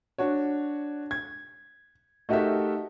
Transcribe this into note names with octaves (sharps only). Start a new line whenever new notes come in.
D4 F#4 C#5
G#6
A3 D#4 F#4 G4 A#4 E5